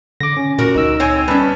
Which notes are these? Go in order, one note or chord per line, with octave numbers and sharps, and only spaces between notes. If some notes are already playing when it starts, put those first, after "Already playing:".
D3 D6 A#6
C#4
A#2 F#4 A#4
C#2 D#4 E6
C4 C#5 G#5
G3 B3 C#4 B4 A5